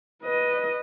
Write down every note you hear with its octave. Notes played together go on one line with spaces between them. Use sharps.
B4 D#5